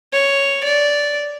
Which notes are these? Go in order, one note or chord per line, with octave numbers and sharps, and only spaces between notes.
C#5
D5